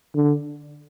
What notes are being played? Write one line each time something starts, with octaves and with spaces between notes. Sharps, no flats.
D3